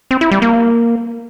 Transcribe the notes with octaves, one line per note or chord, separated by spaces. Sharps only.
C4
E4
G3
A#3